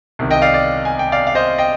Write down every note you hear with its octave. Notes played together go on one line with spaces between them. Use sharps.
C2 C3 D#3
D#5 G5
D5 F5
D5
G#5
G5
D5 F5
F5
C5 D#5
D#5 G5